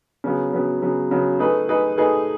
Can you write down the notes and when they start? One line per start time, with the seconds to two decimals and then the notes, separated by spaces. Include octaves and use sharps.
0.24 C#3 F#3 B3
0.53 C#3 F#3 B3
0.82 C#3 F#3 B3
1.11 C#3 F#3 B3
1.39 A3 D#4 G#4 B4
1.69 A3 D#4 G#4 B4
1.97 A3 D#4 G#4 B4